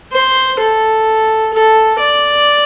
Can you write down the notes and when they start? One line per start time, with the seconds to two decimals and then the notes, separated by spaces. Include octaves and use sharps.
0.12 C5
0.60 A4
1.53 A4
2.00 D5